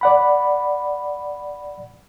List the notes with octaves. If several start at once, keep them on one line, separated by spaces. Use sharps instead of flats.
D5 F#5 B5